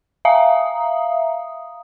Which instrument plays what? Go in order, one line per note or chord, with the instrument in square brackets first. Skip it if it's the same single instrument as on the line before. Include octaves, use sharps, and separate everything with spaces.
[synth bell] E5 F5 A#5 D#6